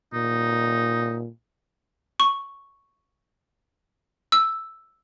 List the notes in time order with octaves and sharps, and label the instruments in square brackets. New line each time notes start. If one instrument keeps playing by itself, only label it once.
[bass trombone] A#2 [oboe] D#4
[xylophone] C#6
E6